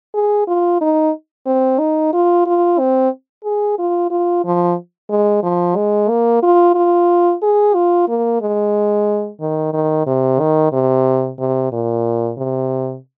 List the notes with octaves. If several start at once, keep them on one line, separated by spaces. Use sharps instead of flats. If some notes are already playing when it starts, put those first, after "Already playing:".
G#4
F4
D#4
C4
D#4
F4
F4
C4
G#4
F4
F4
F3
G#3
F3
G#3
A#3
F4
F4
G#4
F4
A#3
G#3
D#3
D#3
C3
D#3
C3
C3
A#2
C3